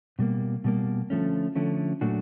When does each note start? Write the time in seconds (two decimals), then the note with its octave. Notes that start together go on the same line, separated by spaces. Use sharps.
0.19 B2 G3 A#3
0.64 B2 G3 A#3
1.10 D3 F3 A3 C#4
1.55 D3 F3 A3 C#4
2.01 A#2 F#3 A3 D4 F#4